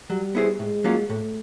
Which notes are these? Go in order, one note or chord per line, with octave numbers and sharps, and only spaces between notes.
F#3 G3
B3 E4 G#4 C5
A2 G#3
F#3 A#3 C#4 F4
A2 A3